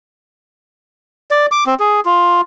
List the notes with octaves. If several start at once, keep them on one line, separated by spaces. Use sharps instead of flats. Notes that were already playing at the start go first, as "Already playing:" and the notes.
D5
D6
C4
G#4
F4